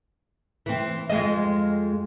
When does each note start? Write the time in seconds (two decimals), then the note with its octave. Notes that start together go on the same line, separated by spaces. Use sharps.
0.66 E3 C4
1.10 F2 G#3 D#5